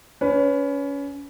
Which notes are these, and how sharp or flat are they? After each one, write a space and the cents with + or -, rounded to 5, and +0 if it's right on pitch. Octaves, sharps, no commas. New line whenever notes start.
C#4 +25 B4 +15